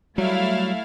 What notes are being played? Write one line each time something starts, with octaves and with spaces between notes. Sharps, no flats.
F#3 G3 A3 E4 F5